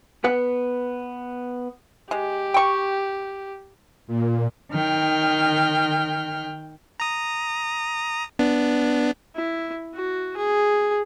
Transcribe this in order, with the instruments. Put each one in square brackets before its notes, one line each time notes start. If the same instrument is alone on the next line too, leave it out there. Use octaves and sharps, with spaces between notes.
[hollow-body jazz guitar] B3 B4 F#5
[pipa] G#3 [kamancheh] G4
[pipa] G5 C#6
[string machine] A#2
[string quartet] D#3 G5 F6
[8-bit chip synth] A#5 D#6
B3 D4
[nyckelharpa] E4
F#4
G#4